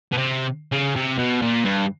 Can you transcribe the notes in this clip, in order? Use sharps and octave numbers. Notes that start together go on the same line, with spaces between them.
B2
C3
C#3
C3
B2
A#2
G2